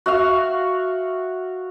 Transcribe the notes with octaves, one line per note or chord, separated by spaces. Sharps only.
F#4 E5 F5